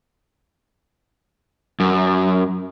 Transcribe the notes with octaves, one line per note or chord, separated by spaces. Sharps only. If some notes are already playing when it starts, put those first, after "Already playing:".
F#2